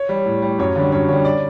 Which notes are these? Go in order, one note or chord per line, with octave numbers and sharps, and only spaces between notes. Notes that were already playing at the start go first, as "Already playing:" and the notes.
Already playing: C#5
G3
A2
G3
F#2 C#5
D3 G3
F#2 C#5
D3 G3 C#5
D5